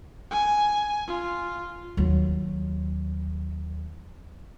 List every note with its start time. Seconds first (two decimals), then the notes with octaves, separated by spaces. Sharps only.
0.31 G#5
1.07 F4
1.97 D#2 F#3